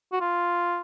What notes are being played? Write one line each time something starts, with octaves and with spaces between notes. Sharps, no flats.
F#4
F4